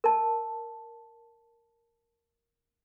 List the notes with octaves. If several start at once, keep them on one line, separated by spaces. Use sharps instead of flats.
A#4 A5